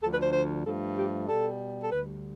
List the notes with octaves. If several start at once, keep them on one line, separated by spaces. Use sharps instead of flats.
D2 D3 F3 A4
B4
C5
C5
G2 F3 A3 A4
G4
B2 G3 A4
A4
D2 D3 G3 B4